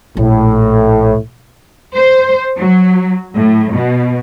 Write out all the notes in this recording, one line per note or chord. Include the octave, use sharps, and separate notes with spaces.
A#1 A2
C5
F#3
A2
B2